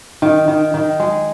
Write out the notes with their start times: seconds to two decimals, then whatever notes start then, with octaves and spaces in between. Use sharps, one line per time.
0.22 D#3
0.48 D#3
0.74 D#3
1.00 G#3